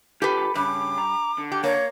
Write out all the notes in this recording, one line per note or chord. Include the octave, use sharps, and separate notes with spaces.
D3 F4 G4 A4 B4
G2 C#3 C#4 D6
A#5
D3
G4
A#3 C#5